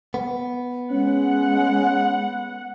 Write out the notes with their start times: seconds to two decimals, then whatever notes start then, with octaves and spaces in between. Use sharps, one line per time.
0.14 B3
0.91 G#3 C#4 F#5